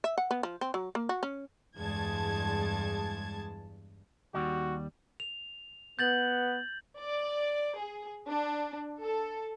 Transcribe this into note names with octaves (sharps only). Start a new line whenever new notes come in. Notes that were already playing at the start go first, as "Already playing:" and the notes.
E5
F#5
B3
F3
C4
F#3
A#3
F#4
C#4
E2 G2 G#3 A5 G#6
D#2 G3 F#4
F7
B3 G6 A6 F#7
D5
G#4
D4
A4